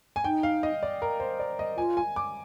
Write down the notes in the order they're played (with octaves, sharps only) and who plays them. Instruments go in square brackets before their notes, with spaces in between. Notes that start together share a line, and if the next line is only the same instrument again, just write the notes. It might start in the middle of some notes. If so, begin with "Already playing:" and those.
[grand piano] G#5
[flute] D#4 [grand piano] G5
[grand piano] F5
D#5
D5
A#4
C5
D5
D#5
[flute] F4 [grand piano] G#5
[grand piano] G#5
D6